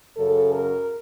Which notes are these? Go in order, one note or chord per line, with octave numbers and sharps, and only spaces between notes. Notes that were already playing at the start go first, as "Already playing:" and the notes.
F#2 C#3 A4
A#4